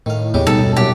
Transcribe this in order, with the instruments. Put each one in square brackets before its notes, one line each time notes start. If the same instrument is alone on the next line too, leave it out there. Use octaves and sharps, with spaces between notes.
[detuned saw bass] A2 [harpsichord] D#3 F5
[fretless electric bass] D#2 B3 [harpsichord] C#3 G#3 G4
[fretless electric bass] B2 G3 B3 [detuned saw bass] D#4 [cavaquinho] A4
[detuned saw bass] F#2
[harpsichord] F#2 [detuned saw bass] A#2 [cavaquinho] G4